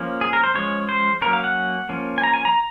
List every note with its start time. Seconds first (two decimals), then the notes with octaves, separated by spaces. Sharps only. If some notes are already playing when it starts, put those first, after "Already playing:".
Already playing: F3 A#3 C#4
0.21 G#4
0.33 A#4
0.44 C5
0.54 F3 G#3 C#4 C#5
0.89 C5
1.21 F#3 A#3 C#4 A#4
1.33 F5
1.44 F#5
1.89 F3 A#3 C#4
2.18 G#5
2.23 A#5
2.33 G#5
2.45 A#5